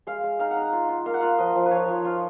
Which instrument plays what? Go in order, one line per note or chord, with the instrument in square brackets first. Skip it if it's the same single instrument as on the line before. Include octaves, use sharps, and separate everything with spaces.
[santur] G#3 F5
G#3
D#4 F5
F#5
D#4
F#5
F4
F4
A#3 F5
F#5
F4 F5
F3 D#5
F3
B4
F3 C#5
F3
F4